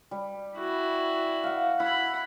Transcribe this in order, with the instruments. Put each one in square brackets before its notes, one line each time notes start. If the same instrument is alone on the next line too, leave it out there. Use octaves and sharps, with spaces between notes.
[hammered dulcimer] G3
[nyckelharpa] E4 F#4
[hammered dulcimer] F5 F#5
[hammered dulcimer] E4 [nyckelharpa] F#5 B5